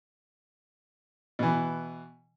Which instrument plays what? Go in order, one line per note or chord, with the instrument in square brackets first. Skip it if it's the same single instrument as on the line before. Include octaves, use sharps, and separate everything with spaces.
[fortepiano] B2 E3